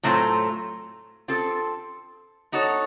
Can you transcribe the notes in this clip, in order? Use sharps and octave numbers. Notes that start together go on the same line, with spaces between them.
A2 F#3 A3 C4 F4
C4 F4 A4
B3 D#4 F#4 A4 C#5